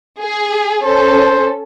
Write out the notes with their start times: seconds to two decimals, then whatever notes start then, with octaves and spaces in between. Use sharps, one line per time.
0.21 G#4
0.83 C#4 A4 C5